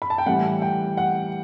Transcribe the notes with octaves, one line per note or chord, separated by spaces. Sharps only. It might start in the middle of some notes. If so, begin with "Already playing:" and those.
B5
A5
G5
A2 E3 G3 F#5
G5
F#5